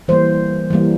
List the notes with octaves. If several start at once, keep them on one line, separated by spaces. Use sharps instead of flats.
E3 G3 A#3 C5
E3 G3 A#3